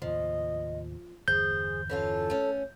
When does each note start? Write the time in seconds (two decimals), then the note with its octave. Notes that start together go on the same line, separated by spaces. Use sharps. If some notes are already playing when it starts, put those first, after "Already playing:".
0.02 D#2 A2 C3 F3 D#5
1.28 G1 E2 G#4 C5 G6
1.89 E3 C#4 F4 A4
2.30 A3 C#4